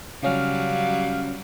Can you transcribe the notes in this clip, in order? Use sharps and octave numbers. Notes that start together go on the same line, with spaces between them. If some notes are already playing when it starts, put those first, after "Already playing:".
C#3 F#3 G3 C#4 F5 F6